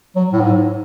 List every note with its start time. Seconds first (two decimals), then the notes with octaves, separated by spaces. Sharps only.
0.16 F#3
0.33 A2
0.41 G#2